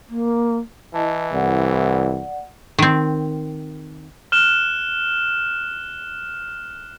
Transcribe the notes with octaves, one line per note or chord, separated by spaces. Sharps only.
A#3
E3 E4 D#5 A5
C2 D5 F#5
D#3 C4
F6 F#6 E7